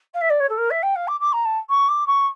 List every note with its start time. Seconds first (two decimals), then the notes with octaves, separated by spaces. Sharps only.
0.14 F5
0.21 E5
0.30 D5
0.40 C#5
0.49 A4
0.57 A#4
0.70 E5
0.82 G5
0.95 F5
1.07 D6
1.20 D6
1.32 A#5
1.45 A5
1.69 C#6
1.88 D6
2.07 C#6